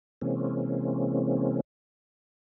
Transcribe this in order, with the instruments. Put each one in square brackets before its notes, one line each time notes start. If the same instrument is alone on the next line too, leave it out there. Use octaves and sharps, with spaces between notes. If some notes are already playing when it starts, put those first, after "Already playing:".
[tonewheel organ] C3 E3 G#3 A#3 C4 C#4